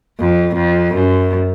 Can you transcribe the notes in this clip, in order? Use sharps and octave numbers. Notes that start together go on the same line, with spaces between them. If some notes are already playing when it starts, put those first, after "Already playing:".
F2
F2
F#2